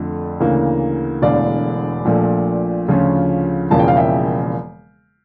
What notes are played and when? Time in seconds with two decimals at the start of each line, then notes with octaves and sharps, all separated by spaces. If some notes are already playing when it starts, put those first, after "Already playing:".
Already playing: F2 D3 A3
0.40 D2 C#3 E3 A#3
1.22 E1 E2 D3 A3 D5 F5
2.05 A#1 A#2 F3 A3
2.88 D2 C#3 F3 C#4 F4
3.71 E1 E2 C#3 F3 A#3 A5
3.79 G5
3.88 F5
3.97 E5 G5